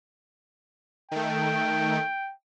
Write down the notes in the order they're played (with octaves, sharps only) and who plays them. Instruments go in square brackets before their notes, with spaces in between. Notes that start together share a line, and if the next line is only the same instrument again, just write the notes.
[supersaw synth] D#3 A3 [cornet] G5